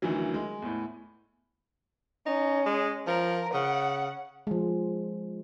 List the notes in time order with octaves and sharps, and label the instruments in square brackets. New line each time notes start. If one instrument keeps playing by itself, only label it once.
[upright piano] D2 D#3 E3 F#3
G#3
E2 A2
[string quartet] C#4 [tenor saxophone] D#4
[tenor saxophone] G#3
[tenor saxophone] F3 [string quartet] A#4
[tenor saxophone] C#3 [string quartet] F#5
[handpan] F3 G#3